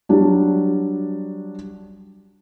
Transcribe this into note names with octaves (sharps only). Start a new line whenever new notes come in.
F#3 G3 D4